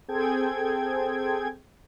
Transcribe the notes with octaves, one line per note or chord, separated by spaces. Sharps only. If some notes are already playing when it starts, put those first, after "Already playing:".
C4 G#4 A4 G5 G#6